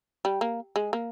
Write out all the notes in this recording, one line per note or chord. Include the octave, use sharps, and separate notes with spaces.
G3
A#3
G#3
A#3